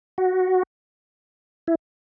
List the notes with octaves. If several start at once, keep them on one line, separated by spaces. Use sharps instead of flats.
F#4
E4